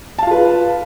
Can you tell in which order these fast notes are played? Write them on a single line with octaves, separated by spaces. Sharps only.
A5 F5 F4 B4